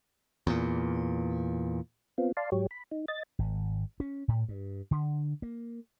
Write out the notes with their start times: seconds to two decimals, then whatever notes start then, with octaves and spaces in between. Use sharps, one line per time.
0.47 E2 A#2
2.18 B3 C4 F4
2.37 D5 F5 A5 C6
2.52 G#2 F#3 G4 C#5
2.71 B5
2.91 D#4
3.08 D#5 A6
3.39 G#1
4.00 C#4
4.28 A2
4.49 G2
4.91 D3
5.42 A#3